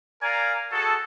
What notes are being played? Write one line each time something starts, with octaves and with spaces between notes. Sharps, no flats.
A#4 D5 F5 G#5 A#5
F#4 G#4 A4